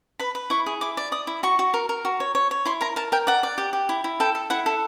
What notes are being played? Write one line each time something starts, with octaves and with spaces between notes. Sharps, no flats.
B4 B5
B4
E4 C#6
G#4
E4 D6
D5
D5 D#6
E4
F#4 C#6
F#4
A#4
A#4
F#4
C#5
C#5
C#5
E4 C6
A#4 A#5
A#4 A5
A#4 G5
D5 F#5
D5
G4
G4
E4
E4
A4 G5
A4
E4 F#5
A4